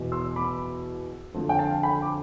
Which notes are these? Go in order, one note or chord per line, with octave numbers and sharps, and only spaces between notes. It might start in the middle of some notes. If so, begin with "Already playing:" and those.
Already playing: E2 B2
C6 E6
B5 D6
F2 D3 F3
G5
F5 A5
G5 B5
D6